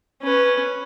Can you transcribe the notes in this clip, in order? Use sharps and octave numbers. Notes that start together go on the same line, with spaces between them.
C#4 B4